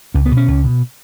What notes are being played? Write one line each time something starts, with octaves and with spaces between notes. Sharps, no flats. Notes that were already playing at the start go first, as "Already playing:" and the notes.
C#2 C#4
B3
B2
C#4
C#2
B2